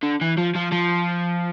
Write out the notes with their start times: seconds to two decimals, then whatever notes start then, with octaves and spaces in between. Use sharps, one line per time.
0.03 D3
0.21 E3
0.37 F3
0.55 F3
0.72 F3